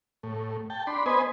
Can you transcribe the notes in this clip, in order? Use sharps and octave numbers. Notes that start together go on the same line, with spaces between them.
A2
G5 A5
D4 B5 C6
B3 B4 C5 D#5 G#5